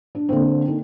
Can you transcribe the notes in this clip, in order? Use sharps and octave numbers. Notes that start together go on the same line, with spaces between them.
D4
D3 A#3 C4
D#4